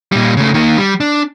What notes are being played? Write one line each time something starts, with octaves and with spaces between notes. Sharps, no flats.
A#2 G3
C#3 A3
D#3 A#3
G3
D4